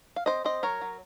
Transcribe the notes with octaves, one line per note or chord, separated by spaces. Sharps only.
F5
C4 C5 D#5
C4 C5 D#5
F#3 A#4 C#5
F#3